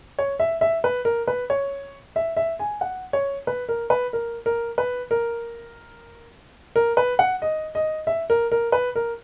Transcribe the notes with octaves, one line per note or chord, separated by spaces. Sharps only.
C#5
E5
E5
B4
A#4
B4
C#5
E5
E5
G#5
F#5
C#5
B4
A#4
B4
A#4
A#4
B4
A#4
A#4
B4
F#5
D#5
D#5
E5
A#4
A#4
B4
A#4